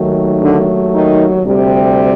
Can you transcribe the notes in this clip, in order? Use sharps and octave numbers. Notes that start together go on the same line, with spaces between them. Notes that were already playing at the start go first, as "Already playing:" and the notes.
Already playing: D#2 D#3 F#3 A3
D3 D4
D#3 D#4
D2 C3 G3